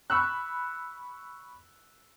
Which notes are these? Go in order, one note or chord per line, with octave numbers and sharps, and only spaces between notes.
B5 C#6 E6 F#6